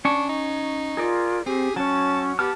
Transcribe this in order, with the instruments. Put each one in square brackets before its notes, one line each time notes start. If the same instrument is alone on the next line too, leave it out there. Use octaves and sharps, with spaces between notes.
[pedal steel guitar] C#4 C#6 [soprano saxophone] D4
[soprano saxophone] D#4
[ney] F4 [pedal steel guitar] G#4 A#4 D5
[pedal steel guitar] C4 [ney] G4 [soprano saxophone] G#4
[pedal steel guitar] F#3 C#5 [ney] C#4 [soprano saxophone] A5
[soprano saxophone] B3 [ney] G4 [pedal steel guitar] A5 D6 F6